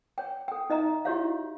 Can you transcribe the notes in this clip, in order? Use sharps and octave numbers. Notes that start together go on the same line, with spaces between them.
C#5 G5
A4 G5
D#4 D#5 E5 A#5
E4 F#4 G4 C#5 E5 F5